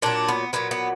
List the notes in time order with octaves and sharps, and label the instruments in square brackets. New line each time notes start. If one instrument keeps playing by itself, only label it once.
[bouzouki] A#2 F#3 D4
B3
A#2 F#3 B3
B3